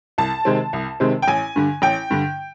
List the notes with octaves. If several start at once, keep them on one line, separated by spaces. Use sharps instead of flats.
C2 A5
C3 D#3 G#3 C4
C2
C3 D#3 G#3 C4
G5
A1 G#5
G2 D3
A1 G5
G2 D3